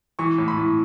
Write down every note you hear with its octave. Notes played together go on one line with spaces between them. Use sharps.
E3 C#6
A2
B5
A2